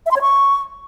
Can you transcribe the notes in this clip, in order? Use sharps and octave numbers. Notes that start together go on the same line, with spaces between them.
E5
C6
C#5
C#6